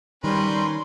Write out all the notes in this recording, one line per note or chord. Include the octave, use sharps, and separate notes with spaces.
D#3 G3 C#4 A#4 B4 C6